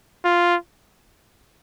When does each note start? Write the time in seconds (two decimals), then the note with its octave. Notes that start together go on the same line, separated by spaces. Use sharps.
0.25 F4